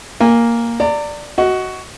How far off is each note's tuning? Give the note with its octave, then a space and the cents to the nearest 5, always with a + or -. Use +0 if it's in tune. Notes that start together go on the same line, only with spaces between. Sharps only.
A#3 +0 G#5 -25
D5 +0 A#5 -40
F#4 +10 D#5 +20